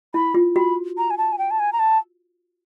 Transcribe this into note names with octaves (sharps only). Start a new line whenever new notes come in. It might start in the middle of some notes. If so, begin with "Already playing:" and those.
E4 B5
F4
F#4 B5
A#5
G#5
A5
G#5
G5
A5
G#5
A#5
A5